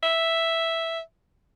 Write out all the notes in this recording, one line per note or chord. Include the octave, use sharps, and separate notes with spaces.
E5